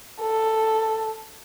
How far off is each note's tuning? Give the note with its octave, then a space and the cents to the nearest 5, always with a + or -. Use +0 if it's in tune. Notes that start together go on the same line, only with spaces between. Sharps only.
A4 +5